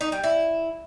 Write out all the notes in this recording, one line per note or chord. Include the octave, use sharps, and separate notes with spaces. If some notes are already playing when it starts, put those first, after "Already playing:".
D#4
G3
E4